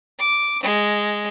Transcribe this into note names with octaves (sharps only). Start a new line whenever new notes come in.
D6
G#3